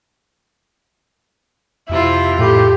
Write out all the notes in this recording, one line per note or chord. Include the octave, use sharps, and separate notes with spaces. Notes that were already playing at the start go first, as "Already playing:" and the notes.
F2 C3 E4 F4
A2 G4 A4 B5